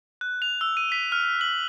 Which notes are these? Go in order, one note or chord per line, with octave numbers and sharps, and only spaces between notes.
F#6
F7
E6
D#7
B6
F6
F#7